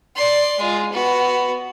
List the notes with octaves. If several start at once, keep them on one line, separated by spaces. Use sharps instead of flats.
D5 C6
G#3 F4
B3 F#4